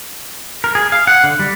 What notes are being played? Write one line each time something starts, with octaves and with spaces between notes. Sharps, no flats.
A#4
G#4
F5
F#5
D3
G3